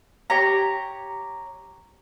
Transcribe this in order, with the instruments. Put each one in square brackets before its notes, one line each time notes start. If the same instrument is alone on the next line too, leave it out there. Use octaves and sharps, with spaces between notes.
[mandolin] G4 C#5 A#5